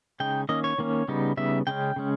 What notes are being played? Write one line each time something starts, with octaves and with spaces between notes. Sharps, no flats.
C#3 G#3 D#4 G5
D#3 A#3 C#4 D#5
C#5
D#3 A#3 C#4
C#3 G3 B3 D#4
C#3 G3 B3 D#4 E5
C#3 G#3 C#4 G5
C#3 G#3 C#4